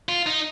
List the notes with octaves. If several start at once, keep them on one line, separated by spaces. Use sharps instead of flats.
F4
D#4